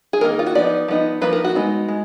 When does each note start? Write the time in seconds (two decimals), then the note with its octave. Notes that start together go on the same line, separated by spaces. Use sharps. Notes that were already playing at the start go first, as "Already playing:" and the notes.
0.13 G#4
0.21 D#3 A#3 D#4 A#4
0.39 F4
0.47 F#4
0.55 F3 B3 D#4 D5
0.88 F3 B3 D#4
1.21 F3 A#3 D#4 B4
1.33 A#4
1.45 F#4
1.56 G#3 B3 D#4
1.89 G#3